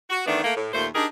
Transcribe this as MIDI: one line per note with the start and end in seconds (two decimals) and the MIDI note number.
0.10 0.22 66
0.26 0.43 51
0.26 0.43 52
0.26 0.43 57
0.26 0.43 59
0.26 0.43 62
0.43 0.54 57
0.43 0.54 58
0.57 0.70 45
0.74 0.87 39
0.74 0.87 46
0.74 0.87 57
0.74 0.87 72
0.95 1.06 62
0.95 1.06 63
0.95 1.06 67
0.95 1.06 68
0.95 1.06 70